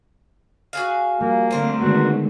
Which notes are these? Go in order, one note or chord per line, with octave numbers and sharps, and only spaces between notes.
F#4 G#4 F5
F3 G3 A#3
D3 A3 C4 A#4 C5
D#3 G#3 B3 F#4